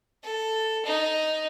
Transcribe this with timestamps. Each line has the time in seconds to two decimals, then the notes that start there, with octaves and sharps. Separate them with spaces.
0.23 A4
0.85 D#4